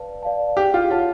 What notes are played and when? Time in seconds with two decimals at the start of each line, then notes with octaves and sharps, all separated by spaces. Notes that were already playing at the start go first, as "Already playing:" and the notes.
Already playing: B4 D5 F5 A5
0.23 D5 F5 A5
0.57 G4 G#4
0.74 F4
0.91 F4 C#5 F#5 A5